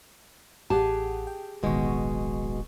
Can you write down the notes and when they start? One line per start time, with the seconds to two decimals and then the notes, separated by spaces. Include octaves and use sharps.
0.70 A1 G4 G#4 F#5 A5
1.27 G5
1.63 D1 A1 B2 D#3 G#3 C#6